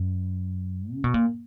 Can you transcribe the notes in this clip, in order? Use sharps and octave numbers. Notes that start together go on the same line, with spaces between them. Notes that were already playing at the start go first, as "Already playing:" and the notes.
Already playing: F#2
C#3
B2
A#2